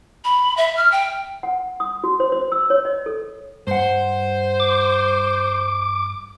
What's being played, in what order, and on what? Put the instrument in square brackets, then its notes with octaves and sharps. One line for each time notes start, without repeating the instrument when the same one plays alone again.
[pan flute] B5
E5
F6
G5
[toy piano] F#5
D#6
F#4
C5
C5
E6
C#5
D#5
A4
[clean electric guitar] G2 F#5 [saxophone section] C5
[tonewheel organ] D6